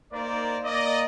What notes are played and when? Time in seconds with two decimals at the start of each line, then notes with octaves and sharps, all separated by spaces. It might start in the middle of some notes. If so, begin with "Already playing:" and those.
0.13 A#3 D#4 A#4 C5 D5
0.65 A#3 D5 D#5